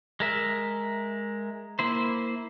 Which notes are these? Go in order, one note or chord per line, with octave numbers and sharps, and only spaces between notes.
G#3 A#4 E5
A#3 E4 C5